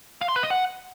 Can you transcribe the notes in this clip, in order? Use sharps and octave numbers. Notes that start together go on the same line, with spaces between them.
F5
C6
B4
D#5
F#5